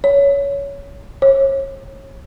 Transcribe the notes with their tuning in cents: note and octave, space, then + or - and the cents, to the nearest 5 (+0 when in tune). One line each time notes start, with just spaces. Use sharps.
C#5 +15
C#5 -35